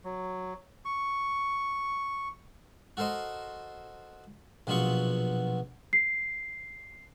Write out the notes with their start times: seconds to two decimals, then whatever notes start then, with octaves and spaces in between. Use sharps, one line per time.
0.05 F#3
0.85 C#6
2.97 F#4 A4 A#4 C5 D#5
4.67 A#1 B2 F#3 B3 F4 C#6
5.93 C7